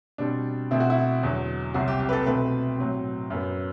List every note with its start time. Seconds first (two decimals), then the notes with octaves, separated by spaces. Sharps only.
0.18 B2 G3 C4 D4
0.71 B2 A3 C4 E4
0.80 F#4
0.90 E4
1.23 E2 D3 F#3
1.74 C2 C3 F#3 C4 F#4
1.88 G4
2.00 G4
2.09 B4
2.13 A4
2.26 B2 A3 C4 B4
2.78 A2 F#3 C4
3.30 F#2 F#3 B3